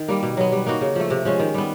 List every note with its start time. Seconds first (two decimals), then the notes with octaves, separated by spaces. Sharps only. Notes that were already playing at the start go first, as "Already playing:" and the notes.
Already playing: D#3
0.08 G3 A#3
0.23 B2
0.37 F#3 B3
0.52 G3
0.66 A#3 D#4 F#4
0.81 C#3
0.96 F3 A3
1.10 C3
1.25 F3 G#3 C#4
1.39 D#3
1.54 G3 B3